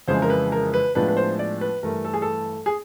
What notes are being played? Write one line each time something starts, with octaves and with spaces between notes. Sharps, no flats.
F2 C#3 E3 G#3 C5
A#4
B4
A#4
B4
A2 F3 G#3 B3 D4 B4
B4
C5
D5
B4
G2 E3 A3 A#4
A4
G#4
A4
G#4